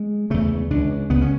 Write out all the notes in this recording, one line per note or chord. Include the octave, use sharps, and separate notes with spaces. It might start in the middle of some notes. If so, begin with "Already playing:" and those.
Already playing: G#3
E2 C#3 A3
C#2 C#3 D4
C#2 C#3 B3
C#4